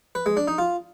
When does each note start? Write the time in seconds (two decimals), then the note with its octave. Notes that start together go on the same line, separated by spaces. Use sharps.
0.15 B4
0.26 G#3
0.37 D4
0.48 D#4
0.58 F4